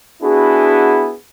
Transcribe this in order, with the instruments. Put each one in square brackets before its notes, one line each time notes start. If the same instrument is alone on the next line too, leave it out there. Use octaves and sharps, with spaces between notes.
[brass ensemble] B3 D4 E4 F#4 G#4